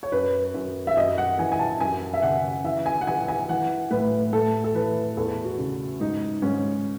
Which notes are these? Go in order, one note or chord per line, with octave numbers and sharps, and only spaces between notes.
C#5
F#2 B4
F#2
E5
F#2 D#5
F#5
E3 G#5
G#5
A5
F#2 G#5
E5
C#3 F#5
E3 E5
G#5
F#5
E3 G#5
G#5
E3 F#5
A2 B4
A2 A4
A4
E3 B4
E2 A4
F#4
C#3
G#2 D#4
G#2 C#4